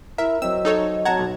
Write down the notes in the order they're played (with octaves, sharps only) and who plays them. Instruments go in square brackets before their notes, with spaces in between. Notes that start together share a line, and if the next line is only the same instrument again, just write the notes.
[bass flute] E4 [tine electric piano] A#4 [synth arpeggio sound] E5
[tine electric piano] F#3 C4 [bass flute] D#5 [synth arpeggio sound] E6
[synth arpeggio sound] D#4 A4 C#5
[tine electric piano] F#3 A5 G#6 [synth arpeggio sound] F#5 A#5
[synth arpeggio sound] B1